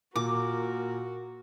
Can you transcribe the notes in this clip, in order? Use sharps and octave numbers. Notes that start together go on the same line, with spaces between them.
A#2 F#4 A#4 D6